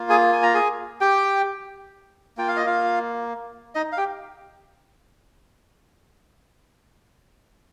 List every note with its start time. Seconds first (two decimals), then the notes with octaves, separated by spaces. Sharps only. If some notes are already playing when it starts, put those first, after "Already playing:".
Already playing: A#3 F4
0.10 G#4 G#5
0.33 G#5
0.43 A#5
0.54 G#4 G#5
1.01 G4 G5
2.37 A#3 F4 G5
2.48 F5
2.56 D#5
2.66 F4 F5
3.75 D#4 D#5
3.92 F5
3.97 G4 G5